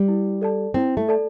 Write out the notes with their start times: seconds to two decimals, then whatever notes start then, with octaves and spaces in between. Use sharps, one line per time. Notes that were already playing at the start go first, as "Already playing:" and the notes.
Already playing: G3
0.08 E4
0.41 A4 D5 A5
0.74 C4 E4
0.97 A3
1.08 A4 D5 A5